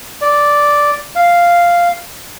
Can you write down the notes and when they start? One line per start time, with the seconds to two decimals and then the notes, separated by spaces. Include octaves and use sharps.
0.22 D5
1.16 F5